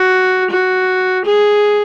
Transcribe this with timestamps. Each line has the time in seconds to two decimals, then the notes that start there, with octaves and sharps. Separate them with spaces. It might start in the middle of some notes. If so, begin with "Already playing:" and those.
Already playing: F#4
0.50 F#4
1.25 G#4